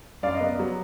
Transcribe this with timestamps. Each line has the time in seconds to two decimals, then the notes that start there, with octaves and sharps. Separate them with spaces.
0.23 F#2 D5 F5
0.35 B3 D#5
0.59 F#3